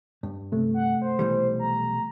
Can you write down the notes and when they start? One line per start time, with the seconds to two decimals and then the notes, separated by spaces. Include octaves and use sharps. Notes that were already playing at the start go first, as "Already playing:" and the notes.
0.23 G2
0.52 C3 A3
0.74 F#5
1.02 C5
1.19 B1 E3 G3
1.59 A#5